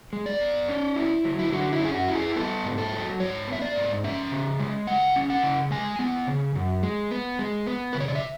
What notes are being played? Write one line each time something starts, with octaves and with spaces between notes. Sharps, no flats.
G#3
D5
B3
C#4
E4
F#3
E4
D3 F#4
E4
C#4
G#4
F#4
E4
G#4
B3 A4
G#2
A4
F#3
G#2 C#5
B3
E5
D5
G#2
C#4 E5
C#3
G#3
C#3 F#5
C#4
F#5
C#3
G#3 G#5
B3
C#3
F#2
G#3
B3
G#3
B3
C#3 B4
C#5
D5
E5